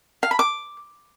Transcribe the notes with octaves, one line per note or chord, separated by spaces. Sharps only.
F5
B5
D6